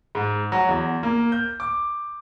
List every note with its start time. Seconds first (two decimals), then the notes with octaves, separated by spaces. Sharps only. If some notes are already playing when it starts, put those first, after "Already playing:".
0.15 G#2
0.52 F#3
0.69 E2
1.03 A#3
1.32 G6
1.60 D6